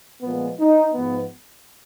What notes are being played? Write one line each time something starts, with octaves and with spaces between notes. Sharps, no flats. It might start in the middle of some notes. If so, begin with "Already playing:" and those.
A#2 F3 G#3 B3
D#4
G#2 F3 B3